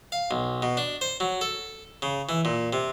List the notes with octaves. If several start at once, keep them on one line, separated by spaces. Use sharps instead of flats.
F5
B1
B2
D4
C5
F#3
A4
C#3
E3
A#2
C3